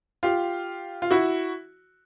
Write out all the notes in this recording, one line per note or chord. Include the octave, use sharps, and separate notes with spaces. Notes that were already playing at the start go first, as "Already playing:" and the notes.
F4 G4
F4
E4 F#4